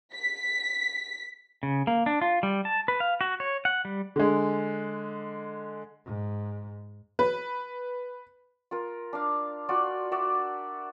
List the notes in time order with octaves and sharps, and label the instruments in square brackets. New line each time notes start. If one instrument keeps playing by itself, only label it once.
[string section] B6
[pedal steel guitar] C#3
A#3
D4
F4
G3
A5
B4
F5
F#4
C#5
F#5
G3
[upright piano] D3 G#3
[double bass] G#2
[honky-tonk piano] B4
[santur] F4 A#4
D4 F5
F4 F#4 D5
F#4 D5 E5